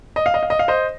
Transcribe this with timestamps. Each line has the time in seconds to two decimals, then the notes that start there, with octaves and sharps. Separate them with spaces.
0.16 D#5
0.26 F5
0.34 D#5
0.43 F5
0.50 D#5
0.59 F5
0.68 C5 D#5